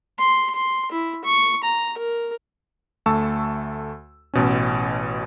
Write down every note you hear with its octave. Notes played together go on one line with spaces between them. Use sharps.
C6
C6
E4
C#6
A#5
A#4
D2 A3 A5 C#6 E6
A1 B2 C#4